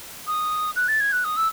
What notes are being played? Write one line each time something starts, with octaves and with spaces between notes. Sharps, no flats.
D#6
F#6
A6
G#6
F#6
D#6
E6